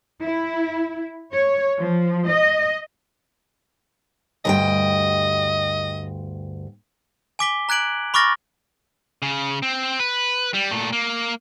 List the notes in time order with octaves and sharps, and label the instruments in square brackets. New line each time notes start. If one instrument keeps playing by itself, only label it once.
[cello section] E4
C#5
F3
D#5
[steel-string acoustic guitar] D2 G2 G5 [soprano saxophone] D#5
[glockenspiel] G#5 D6 B6 G7
A#5 F#6 G#6 D7 F#7
B5 C#6 D6 F6 A6 A#6
[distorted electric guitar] C#3
C4
B4
G3
A#2 A3
A#3